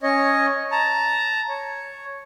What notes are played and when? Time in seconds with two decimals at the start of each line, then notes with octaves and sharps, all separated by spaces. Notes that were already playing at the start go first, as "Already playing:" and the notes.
0.03 C#4 C#5 D#5
0.72 A5 A#5
1.49 C#5